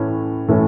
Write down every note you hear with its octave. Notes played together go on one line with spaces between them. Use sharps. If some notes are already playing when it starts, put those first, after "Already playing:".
Already playing: A2 E3 A3 C#4
A2 E3 A3 C#4